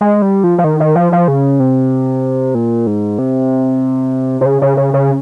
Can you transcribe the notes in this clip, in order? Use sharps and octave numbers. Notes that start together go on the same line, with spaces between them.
G#3
G3
F3
F3
D#3
D#3
F3
F3
C#3
C3
A#2
G#2
C3
C3
C#3
C#3
C#3
C#3